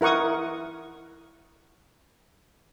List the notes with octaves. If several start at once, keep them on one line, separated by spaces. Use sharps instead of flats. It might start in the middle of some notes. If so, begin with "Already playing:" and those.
E4 A#4 F#5 C#6 D#6